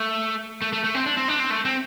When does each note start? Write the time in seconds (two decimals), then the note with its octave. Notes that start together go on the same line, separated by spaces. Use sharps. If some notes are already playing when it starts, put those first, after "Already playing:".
Already playing: A3
0.62 A3
0.73 A3
0.84 A3
0.95 C4
1.06 D4
1.17 C4
1.28 D4
1.40 C4
1.50 A3
1.65 C4